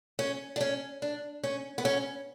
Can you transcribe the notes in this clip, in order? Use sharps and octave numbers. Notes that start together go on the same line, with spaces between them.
C#4
D4
C#4
D4
C#4
B3
C#4